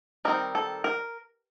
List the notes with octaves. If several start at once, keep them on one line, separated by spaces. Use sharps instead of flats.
D#3 G3 C4 D#4 A#4
A4
A#4